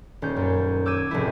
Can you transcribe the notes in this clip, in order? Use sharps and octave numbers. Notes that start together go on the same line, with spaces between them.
D#1 C#4 G6
F#2
D6 E6 G6 G#6 D#7
F1 A2 G#3 E4